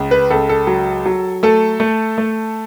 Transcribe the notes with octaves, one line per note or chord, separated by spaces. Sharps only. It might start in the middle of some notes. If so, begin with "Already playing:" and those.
Already playing: C#2
B4
C#2 A4
A4
F#3
F#3
A3 A4
A3
A3